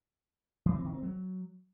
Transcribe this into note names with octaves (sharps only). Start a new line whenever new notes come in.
E3
C4
D#3
C4
F#3